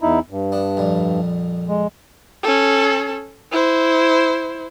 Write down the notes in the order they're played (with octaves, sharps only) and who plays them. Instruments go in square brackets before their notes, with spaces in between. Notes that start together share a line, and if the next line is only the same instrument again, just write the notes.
[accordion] E2 D#4 E4
G2
[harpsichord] B3 D4
A#1 F2 G3
[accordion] G#3
[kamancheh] C#4 A4
E4 C5